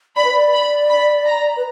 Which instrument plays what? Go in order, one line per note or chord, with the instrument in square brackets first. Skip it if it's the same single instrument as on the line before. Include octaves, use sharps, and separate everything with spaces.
[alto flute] D5 [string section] B5
[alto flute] B4
D5
[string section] B5
B5
A#5
[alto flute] B4